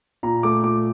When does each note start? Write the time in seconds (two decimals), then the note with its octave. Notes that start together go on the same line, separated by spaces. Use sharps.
0.23 A#2 A#5
0.43 A3 D6
0.63 A#2 D6